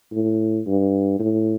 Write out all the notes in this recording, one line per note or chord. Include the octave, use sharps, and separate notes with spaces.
A2
G2
A2